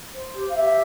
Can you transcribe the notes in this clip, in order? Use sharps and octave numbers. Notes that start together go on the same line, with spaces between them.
C5
G4
F5
G4 E5